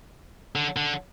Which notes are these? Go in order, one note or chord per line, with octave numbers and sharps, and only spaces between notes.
D3
D3